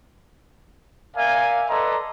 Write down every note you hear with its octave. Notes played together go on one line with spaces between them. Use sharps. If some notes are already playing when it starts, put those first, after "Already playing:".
A#4 D5 E5 F5 G#5
A4 B4 D5 D#5 A#5 C6